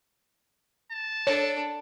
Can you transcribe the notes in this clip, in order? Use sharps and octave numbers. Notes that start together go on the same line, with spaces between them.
A5
D4 A4 C#5